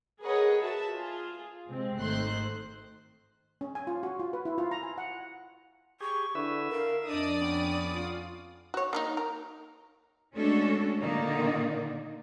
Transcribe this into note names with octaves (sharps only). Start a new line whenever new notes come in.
G#4 A#4 B4 C#5 D#5 F#5
F#4 E5 A5
F4 G#4
C3 G#3 C4
G#1 D#3 A3 C5 C6 F#6
C#4
G#5
F4
F#4
F4
B4
E4
F4
A#5
G#5
F#5
G4 G#4 C#6
D3 E4 B4 E5
A#4 E5 F5
F2 D4 D5 D#5 D#6
B3 C#4 G5
F4
F#4 C#5
A#3 D4 D#4
A#4
G#3 A3 C#4 D4 F#4 A4
A#2 D3 D#3 A#3 D#4 D5